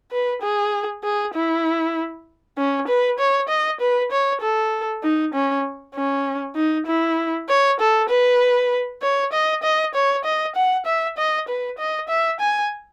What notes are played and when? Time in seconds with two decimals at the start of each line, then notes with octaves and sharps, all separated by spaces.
0.12 B4
0.42 G#4
1.04 G#4
1.34 E4
2.58 C#4
2.88 B4
3.19 C#5
3.49 D#5
3.81 B4
4.11 C#5
4.41 A4
5.03 D#4
5.34 C#4
5.95 C#4
6.56 D#4
6.87 E4
7.49 C#5
7.80 A4
8.10 B4
9.02 C#5
9.32 D#5
9.63 D#5
9.95 C#5
10.24 D#5
10.55 F#5
10.86 E5
11.17 D#5
11.48 B4
11.78 D#5
12.09 E5
12.40 G#5